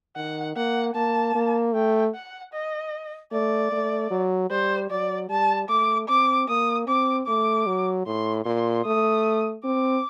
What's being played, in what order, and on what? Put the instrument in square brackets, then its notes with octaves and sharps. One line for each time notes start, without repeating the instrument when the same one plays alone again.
[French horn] D#3 [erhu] F#5
[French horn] A#3 [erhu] F#5
[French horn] A#3 [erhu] A5
[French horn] A#3
[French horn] A3 [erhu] G5
[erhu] F#5
D#5
[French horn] A3 [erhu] D5
[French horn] A3
F#3
[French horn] G3 [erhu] C5
[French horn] F#3 [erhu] D5
[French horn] G3 [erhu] A5
[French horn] A3 [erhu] D6
[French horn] C4 [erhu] D6
[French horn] A#3 [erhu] D#6
[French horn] C4 [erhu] D6
[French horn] A3 [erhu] D6
[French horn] F#3
[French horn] A2 [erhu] C6
[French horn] A#2 [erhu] C6
[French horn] A3 [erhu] D#6
[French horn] C4 [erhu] D6